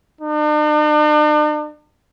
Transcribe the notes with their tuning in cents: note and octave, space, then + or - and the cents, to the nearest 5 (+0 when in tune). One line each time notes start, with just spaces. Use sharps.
D4 +45